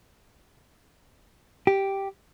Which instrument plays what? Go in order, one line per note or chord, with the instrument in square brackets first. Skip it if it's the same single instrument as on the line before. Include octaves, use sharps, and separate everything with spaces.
[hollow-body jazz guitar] G4